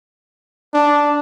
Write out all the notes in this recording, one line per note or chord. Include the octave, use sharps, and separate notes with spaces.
D4